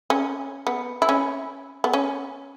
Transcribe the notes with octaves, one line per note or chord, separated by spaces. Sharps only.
C#4
B3
E4
C#4
B3
C#4